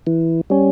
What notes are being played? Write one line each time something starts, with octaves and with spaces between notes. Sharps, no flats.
E3
G3 C#4